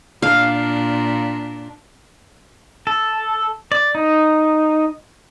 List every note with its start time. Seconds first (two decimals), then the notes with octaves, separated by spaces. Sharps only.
0.22 A#2 D4 F5
2.87 A4
3.72 D5
3.95 D#4